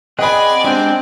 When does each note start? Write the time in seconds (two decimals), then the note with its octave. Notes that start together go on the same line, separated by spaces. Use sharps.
0.19 C4 G#4 D5 D#5 F#5 G#5 B5
0.64 G#3 C4 D4 G4